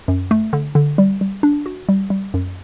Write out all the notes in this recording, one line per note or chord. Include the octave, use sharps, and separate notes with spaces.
F#2
A3
D3
D3
G3
G3
D4
F#4
G3
G3
F#2